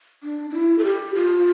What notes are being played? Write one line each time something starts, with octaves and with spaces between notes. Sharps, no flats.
D4
D4
E4
A4
G4
F4